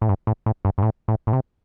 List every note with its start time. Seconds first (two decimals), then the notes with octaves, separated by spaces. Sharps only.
0.01 A2
0.09 G2
0.27 A2
0.46 A2
0.65 G2
0.78 G2
0.83 A2
1.08 A2
1.27 A2
1.33 C3